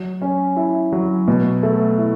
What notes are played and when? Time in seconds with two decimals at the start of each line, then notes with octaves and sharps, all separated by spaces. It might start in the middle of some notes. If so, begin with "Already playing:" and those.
Already playing: F#3
0.22 C#4
0.57 E4
0.92 F#3
1.28 B2
1.63 A3
1.98 E4